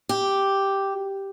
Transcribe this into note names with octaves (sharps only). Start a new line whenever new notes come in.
G4